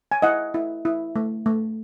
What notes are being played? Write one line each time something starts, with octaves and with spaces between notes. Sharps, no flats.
G#5
E4 D#5 F#5
E4
E4
A3
A3